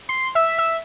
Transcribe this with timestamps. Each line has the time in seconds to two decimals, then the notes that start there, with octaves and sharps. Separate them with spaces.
0.09 C6
0.35 E5
0.58 E5